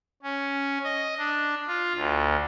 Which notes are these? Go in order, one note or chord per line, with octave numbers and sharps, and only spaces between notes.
C#4
D#5
D4
F4
D2